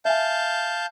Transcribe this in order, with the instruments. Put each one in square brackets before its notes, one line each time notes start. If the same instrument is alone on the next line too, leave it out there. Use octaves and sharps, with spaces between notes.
[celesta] E5 G#5 [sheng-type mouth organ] F5 A5 G6